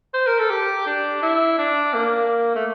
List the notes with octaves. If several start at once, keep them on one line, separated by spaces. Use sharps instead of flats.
C5
A#4
A4
G4
D4
E4
D4
A#3
A3